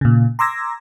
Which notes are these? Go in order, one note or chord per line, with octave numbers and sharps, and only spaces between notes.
A#2 C#3
A#5 C6 D6 E6 G#6 A#6